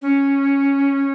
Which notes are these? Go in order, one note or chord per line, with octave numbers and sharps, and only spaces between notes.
C#4